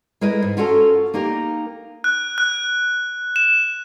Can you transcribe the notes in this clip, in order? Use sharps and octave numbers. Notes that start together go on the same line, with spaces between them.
G#3 E4 A#4 B4 D#5
G#2
C#4 F4 F#4 A4 A#4
A#3 D#4 G4 A#4
F#6
F#6
E7